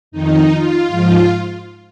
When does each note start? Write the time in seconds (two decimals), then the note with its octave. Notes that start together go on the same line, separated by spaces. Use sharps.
0.11 F2 D#3 D#4
0.49 F4
0.88 G#2 F3 F4